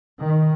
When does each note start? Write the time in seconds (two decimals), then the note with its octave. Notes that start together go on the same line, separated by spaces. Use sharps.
0.22 D#3